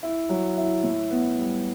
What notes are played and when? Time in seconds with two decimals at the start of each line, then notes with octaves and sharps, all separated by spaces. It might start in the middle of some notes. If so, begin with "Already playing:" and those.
0.03 E4
0.29 F#3
0.58 E4
0.83 A2
1.11 B3
1.39 G3